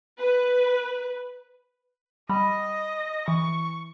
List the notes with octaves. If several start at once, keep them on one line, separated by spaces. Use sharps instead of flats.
B4
G3 D#5 B5
E3 C#6